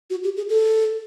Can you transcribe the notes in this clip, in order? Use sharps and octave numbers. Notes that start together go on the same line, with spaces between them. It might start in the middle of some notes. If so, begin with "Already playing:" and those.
F#4
G4
G#4
A4